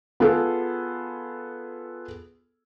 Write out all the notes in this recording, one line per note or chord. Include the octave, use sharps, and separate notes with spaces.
B3 F4 G#4 A4